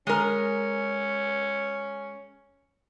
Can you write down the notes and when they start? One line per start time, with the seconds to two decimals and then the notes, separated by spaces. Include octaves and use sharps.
0.07 G#3 C#4 A#4